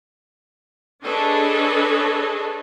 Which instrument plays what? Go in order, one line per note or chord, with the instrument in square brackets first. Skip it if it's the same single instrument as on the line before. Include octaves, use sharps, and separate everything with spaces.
[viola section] D4 G#4 A4 B4 C#5 D#5